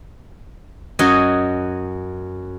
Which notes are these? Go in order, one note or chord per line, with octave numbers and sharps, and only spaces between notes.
F#2 F#4 D#5 G#5